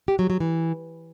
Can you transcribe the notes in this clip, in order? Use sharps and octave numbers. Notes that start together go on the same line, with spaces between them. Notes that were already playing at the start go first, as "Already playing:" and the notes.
G4
F#3
F#3
E3